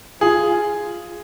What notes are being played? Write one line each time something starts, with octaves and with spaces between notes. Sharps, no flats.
F4 G#4